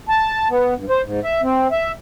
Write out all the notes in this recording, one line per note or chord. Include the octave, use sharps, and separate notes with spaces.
A5
B3
G2
C5
G#2
E5
C4
E5